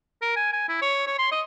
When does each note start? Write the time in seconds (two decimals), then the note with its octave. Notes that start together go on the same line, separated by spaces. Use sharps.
0.22 A#4
0.36 G#5
0.53 G#5
0.69 E4
0.82 C#5
1.07 C#5
1.19 C6
1.32 D#5